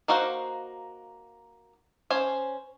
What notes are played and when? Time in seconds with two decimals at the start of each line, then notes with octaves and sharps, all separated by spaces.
0.08 A#3 D#4 F#4 C5 F5
2.10 C#4 C5 G#5